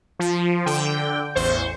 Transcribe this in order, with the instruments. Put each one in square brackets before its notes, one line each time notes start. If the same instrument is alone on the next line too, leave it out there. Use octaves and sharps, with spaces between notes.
[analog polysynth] F3
D3 G5
A1 E2 C5 C#6